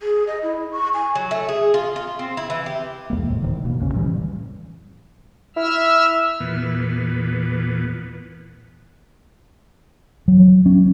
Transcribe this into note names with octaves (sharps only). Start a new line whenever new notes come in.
G#4
D#5
E4
C#6
G#5
F#3
A3
G#4
F4
F4
C4
E4
E3
G4
E2 G#2 G#3 A#3
A2 C3
D1 D#3
B2 A#3
B1 F2 C#3 C#4
A2 E3 G3
E4 E5 E6 F6
E2 A#2 B3
F#3
C#4